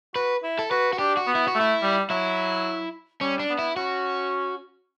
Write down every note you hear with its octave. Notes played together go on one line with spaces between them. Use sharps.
F#4 B4
E4
A4
F#4 B4
F#4
D4 G4
F#4
B3
E4
F#4
A3
E4
G3
F#3 E4
G3 C#4
D4
B3
E4
C#4 F#4